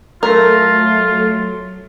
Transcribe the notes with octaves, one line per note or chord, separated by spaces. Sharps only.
F#3 A3 F4 A#4